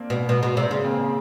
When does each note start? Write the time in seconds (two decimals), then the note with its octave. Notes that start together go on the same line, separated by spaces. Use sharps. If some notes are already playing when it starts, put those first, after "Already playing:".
Already playing: A#3 C4 D4
0.10 B2
0.29 B2
0.43 B2
0.57 C3
0.71 C#3
0.84 A#3 C4